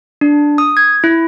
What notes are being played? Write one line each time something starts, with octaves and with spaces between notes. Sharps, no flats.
D4
D#6
G#6
E4